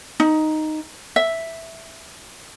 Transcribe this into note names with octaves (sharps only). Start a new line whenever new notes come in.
D#4
E5